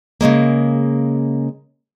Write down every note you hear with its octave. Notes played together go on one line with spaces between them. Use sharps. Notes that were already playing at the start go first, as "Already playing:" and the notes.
C#3 F3 G#3 A#3